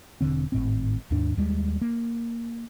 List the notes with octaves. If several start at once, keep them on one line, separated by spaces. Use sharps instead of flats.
E1 B1 D3 C4
G#1 A2 C4
D#2 G#2 D4
D#2 G3 G#3
A#3